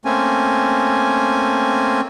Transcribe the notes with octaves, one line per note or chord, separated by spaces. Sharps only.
A3 A#3 C4 C#4 G#5